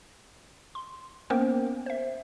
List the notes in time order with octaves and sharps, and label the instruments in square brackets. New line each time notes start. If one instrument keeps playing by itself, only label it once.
[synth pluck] C6
A#3 B3 C#4 A#4 C5 G5
C5 E5